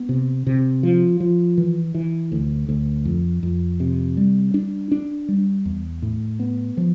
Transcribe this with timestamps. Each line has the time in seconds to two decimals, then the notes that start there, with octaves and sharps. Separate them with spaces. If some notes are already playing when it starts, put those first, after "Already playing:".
Already playing: B3
0.09 C3
0.47 C3
0.83 F3
1.20 F3
1.58 E3
1.95 E3
2.32 D2
2.69 D2
3.05 F2
3.43 F2
3.80 C3
4.17 G3
4.54 D4
4.92 D4
5.29 G3
5.65 E2
6.02 A2
6.39 B3
6.77 F3